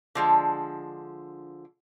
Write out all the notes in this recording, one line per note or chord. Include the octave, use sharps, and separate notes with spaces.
D3 F3 G#3